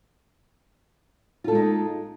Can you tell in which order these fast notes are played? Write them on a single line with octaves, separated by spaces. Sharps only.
F4 A4 G#3 D#4